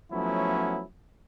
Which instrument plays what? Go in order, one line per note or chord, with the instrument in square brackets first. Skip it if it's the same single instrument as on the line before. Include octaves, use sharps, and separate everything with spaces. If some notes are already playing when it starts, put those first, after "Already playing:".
[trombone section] F3 F#3 A3 B3 C#4 E4